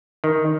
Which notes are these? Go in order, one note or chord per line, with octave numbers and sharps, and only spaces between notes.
D#3